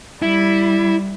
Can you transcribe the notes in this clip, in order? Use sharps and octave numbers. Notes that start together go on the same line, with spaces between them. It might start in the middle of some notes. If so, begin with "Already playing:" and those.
G3 E4